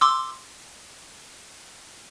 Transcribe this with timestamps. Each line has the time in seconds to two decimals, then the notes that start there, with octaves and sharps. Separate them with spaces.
0.01 C6 D6 E6